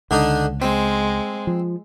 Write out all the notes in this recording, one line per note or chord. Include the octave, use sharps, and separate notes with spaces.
C#2 D3 D4 D#4
G#3 C4
F3